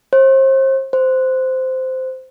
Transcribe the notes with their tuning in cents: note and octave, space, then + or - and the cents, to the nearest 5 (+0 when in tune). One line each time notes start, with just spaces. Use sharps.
C5 +35
C5 -10